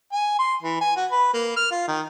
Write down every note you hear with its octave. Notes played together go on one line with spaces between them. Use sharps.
G#5
C6
E3
G#5
F#4
B4
A#3
F6
F4
D#3